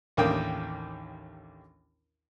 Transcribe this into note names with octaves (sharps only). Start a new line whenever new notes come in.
A1 D#2 A#3 D4 G5 D#6